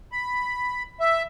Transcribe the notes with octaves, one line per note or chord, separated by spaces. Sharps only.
B5
E5